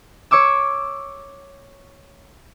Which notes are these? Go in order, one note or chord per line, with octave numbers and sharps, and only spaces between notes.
C#5 C#6 D6 E6